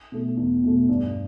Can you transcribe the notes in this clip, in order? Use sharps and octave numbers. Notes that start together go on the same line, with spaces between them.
B2 A3
E2
B2 A3
G2